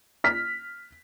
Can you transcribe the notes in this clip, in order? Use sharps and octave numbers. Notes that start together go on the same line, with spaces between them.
F6 B6